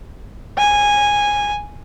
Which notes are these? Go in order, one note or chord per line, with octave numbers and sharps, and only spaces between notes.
G#5